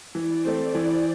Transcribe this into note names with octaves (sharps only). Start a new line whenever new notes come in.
E3 D5
A3 C4
E3 C5